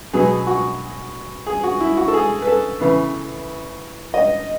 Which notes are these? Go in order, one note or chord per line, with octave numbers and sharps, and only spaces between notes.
B2 F#3 B3 G#4
F#4
G#4
F#4
E4
F#4
A4
G#4
B4
A4
C#3 E3 B3
D#5